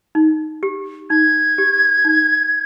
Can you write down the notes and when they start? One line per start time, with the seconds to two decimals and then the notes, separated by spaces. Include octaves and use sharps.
0.15 D#4
0.63 G4
1.10 D#4 G#6
1.58 G4
2.05 D#4